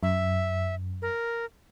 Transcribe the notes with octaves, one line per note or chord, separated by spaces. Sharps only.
F#2 E5
A#4